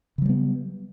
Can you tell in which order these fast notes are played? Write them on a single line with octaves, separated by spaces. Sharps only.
C#3 F#3 G3 B3